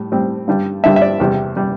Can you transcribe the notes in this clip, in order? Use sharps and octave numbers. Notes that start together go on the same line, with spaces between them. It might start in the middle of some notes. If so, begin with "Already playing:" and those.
Already playing: A2 G3
A2 G3 C4
G2 D3 G3
G2 D3 G3 E5
E5
D5
E2 C3 G3
C3 G3